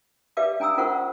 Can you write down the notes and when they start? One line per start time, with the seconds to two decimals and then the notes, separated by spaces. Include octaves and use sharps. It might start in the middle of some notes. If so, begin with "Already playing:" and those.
0.37 G4 B4 D5 E5 F5 D6
0.60 C#4 G#5 A#5 D#6 E6
0.77 C#4 F4 A#4 C5 F#5 C#6